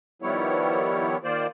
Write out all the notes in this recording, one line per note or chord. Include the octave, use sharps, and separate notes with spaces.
D#3 F3 G3 B3 E4 C#5
D#3 A#3 F4 C5 D5